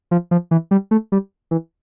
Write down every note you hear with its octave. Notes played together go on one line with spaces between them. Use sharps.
F3
F3
E3
G3
A3
G3
E3